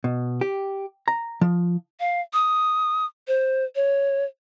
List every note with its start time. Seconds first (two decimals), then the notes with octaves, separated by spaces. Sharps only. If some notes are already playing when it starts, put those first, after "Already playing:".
0.04 B2
0.41 G4
1.08 A#5
1.41 F3
2.00 F5
2.33 D#6
3.28 C5
3.75 C#5